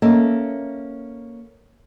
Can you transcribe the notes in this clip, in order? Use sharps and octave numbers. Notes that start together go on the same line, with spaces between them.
A#3 C#4 A4 D#5 E5